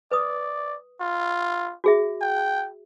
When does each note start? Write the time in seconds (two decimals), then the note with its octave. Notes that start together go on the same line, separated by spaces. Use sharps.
0.11 B4 D5 D#6
1.01 F4
1.84 F#4 G#4 E5
2.21 G5